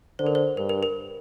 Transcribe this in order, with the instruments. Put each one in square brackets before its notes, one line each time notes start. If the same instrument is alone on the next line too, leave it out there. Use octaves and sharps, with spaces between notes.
[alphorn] D3 [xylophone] C5
[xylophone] A#4
C5
[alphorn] G2 [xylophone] A#4
[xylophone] A#4
A#4